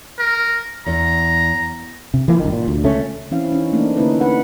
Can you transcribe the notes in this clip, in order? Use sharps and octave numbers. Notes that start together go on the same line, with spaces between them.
A#4
E2 A#5
C3
E3 F3 A#3
G1 C#2 D#3
A#2
D2
C#2 A3 C#4
E3 C4 C#4 E4 F5
C#4 D#4
A3 A#3 C4 D4 D#4
D3 A#3 C#4 D#4 E4 B4
B4 F#5